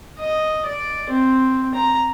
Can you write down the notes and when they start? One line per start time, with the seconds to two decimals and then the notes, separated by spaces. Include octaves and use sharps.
0.19 D#5
0.66 D5
1.10 C4
1.75 A#5